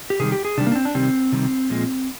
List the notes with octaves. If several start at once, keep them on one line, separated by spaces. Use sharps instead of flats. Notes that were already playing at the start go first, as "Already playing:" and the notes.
G4
C3 D#3 G3 G#4
G4
G#4
C3 D#3 G3 D4
A#3
D4
C4
D4
C3 D#3 G3 C4
C3 D#3 G3
A#2 F3 G#3